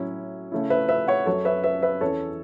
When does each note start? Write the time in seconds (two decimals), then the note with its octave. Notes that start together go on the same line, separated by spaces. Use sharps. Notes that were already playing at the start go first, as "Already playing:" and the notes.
Already playing: A2 F#3 C#4 E4
0.52 C#3 A3 C#4 E4
0.70 B4 E5
0.89 B4 E5
1.08 C#5 F#5
1.26 F#2 F#3 C#4 A4 C#5
1.45 B4 E5
1.64 B4 E5
1.82 B4 E5
2.01 E2 E3 C#4 E4 A4 C#5